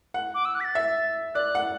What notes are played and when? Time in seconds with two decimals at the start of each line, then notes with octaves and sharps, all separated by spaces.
0.14 F#5
0.35 D6
0.45 E6
0.55 F#6
0.60 B6
0.65 A6
0.75 E5
1.35 D5 F#6
1.55 F#5